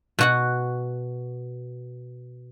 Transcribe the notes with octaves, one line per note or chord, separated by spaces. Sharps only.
B2 F#4 F#5